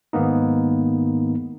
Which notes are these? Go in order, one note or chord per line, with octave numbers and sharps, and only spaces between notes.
G#2 D#3 A#3 B3 D#4